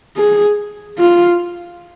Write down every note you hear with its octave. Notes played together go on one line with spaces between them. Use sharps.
G#4
F4